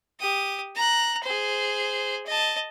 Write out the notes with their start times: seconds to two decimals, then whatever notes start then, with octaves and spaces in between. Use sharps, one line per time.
0.20 G4 D#6
0.76 A#5 F#6
1.23 G#4 C5
2.26 D#5 A5